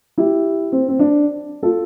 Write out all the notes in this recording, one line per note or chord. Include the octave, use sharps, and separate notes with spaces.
E4 G4
C4
C4
D4
F4 A4